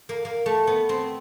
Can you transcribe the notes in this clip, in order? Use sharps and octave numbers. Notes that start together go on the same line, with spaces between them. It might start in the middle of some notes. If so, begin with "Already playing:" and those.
A#3
A#3
A3
B3
C4